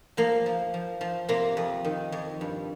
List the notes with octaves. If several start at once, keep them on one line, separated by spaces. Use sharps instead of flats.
F3 A#3
F3
F3
F3
C3 A#3
F2
D#3
F2
G2